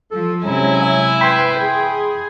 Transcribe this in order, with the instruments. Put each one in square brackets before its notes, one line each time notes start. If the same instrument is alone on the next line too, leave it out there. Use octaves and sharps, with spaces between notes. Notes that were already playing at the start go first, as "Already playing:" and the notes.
[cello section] F3 [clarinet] A4
[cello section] C3 G#3 C#4 [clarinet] F#3 [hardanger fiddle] E4 G#5
[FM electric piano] E5
[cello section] B4 [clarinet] G5 [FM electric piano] B5 C6 G#6
[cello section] G#4